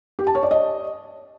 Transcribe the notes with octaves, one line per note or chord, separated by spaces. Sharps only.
G4
A5
C#5
D5
D#5